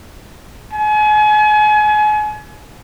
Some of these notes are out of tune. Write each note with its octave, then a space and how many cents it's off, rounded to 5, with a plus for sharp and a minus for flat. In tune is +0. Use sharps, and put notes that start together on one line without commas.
G#5 +35